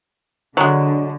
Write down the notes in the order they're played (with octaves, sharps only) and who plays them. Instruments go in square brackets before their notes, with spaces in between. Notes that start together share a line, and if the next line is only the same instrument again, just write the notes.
[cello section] D3 [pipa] F#3 G#3